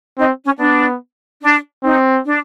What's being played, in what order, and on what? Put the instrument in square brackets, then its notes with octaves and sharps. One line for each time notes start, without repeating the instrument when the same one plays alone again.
[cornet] C4 [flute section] D#4
[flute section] C#4
[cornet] B3 [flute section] D4
[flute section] D4
[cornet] C4 [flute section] D#4
[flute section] D4